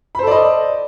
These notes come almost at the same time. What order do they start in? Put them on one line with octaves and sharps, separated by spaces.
B5 C5 A4 D5 D#5